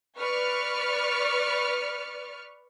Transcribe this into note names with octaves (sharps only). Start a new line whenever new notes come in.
B4 D5 C#6 F6